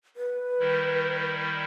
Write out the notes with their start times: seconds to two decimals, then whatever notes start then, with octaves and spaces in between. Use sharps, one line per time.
0.16 B4
0.60 D#3 G3 E4